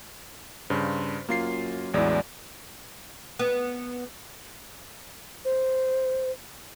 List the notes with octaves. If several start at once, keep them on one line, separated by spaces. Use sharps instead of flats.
G2 C#3 C5
F#2 A#3 F4 C7
A1 E2 G#3 E4 D5
B3
C5